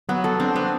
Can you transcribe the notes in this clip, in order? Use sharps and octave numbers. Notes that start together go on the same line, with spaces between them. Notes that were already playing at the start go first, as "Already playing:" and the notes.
F#3 B3
A4
C4 D4
B3